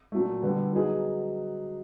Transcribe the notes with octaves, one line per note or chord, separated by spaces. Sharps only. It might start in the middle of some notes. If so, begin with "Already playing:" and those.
A#2 F#3 A3
D3 G3 B3
F#3 B3 D#4 G#4